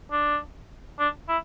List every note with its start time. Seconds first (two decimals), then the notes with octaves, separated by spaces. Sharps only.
0.12 D4
0.99 D4
1.28 E4